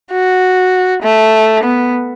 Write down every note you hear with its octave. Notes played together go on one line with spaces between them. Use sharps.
F#4
A3
B3